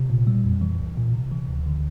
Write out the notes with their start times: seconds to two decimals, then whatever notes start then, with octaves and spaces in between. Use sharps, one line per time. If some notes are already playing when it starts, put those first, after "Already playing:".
Already playing: C3
0.10 A#2
0.27 G3
0.44 F2
0.61 E3
0.80 C2
0.97 A#2
1.13 C3
1.32 E3
1.49 D2
1.66 D3